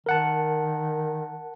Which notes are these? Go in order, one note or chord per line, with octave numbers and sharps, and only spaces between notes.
D#3 A#4 F#5 A5